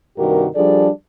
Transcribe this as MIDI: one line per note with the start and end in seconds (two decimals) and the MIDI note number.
0.17 0.46 43
0.17 0.46 48
0.17 0.46 51
0.17 0.46 66
0.17 0.46 67
0.17 0.46 70
0.55 0.88 53
0.55 0.88 55
0.55 0.88 62
0.55 0.88 68
0.55 0.88 69
0.55 0.88 74